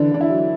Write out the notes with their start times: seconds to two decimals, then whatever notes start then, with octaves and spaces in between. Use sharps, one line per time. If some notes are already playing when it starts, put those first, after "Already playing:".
Already playing: D3 E3 D4
0.12 D3 D4
0.21 E4
0.30 F#3